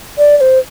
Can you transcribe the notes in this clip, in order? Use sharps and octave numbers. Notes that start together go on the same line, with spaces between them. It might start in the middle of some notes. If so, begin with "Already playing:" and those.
D5
D5
C5